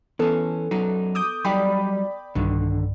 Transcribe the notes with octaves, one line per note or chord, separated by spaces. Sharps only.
E3 B3 C#4 A4
F#2 F#3 D#4
D6 D#6 G6
F#3 G3 D#4 D5 G5 B5
B1 G2 D3 D#3